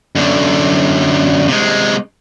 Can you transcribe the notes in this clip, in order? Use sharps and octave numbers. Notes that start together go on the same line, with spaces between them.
F#2 D3
C3 G#3